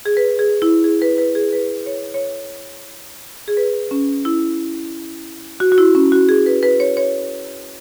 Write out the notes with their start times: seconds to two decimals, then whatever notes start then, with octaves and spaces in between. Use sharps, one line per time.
0.05 G#4
0.17 B4
0.39 G#4
0.62 E4
0.84 G#4
1.02 B4
1.18 B4
1.35 G#4
1.53 B4
1.86 C#5
2.14 C#5
3.48 G#4
3.57 B4
3.91 C#4
4.25 E4
5.60 F#4
5.72 F#4
5.78 E4
5.95 C#4
6.12 F#4
6.29 G#4
6.46 B4
6.63 B4
6.80 C#5
6.97 C#5